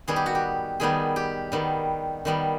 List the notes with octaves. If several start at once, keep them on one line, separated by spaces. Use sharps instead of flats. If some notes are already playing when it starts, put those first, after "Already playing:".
D#3 G3 B3 G#4
G4
F#4
G4
D#3 G3 B3 G#4
G4
D#3 G3 B3
D#3 G3 B3